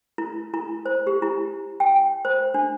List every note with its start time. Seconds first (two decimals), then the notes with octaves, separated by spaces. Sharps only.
0.18 E4
0.54 E4
0.86 C5
1.07 G4
1.22 E4
1.80 G5
2.25 C5
2.54 D4